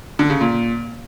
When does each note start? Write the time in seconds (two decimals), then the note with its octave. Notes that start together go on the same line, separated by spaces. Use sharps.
0.19 D3
0.30 C#3
0.41 A#2